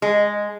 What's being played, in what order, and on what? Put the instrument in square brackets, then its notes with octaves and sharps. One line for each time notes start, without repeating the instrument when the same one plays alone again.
[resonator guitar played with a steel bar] G#3